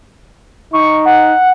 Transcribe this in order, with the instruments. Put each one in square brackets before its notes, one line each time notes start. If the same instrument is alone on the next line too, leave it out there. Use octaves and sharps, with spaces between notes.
[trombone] D#4 [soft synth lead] C#6
[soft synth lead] F#5